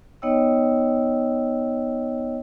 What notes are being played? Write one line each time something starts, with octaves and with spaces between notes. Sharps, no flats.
B3 D#4 C#5 D#5 G5 E6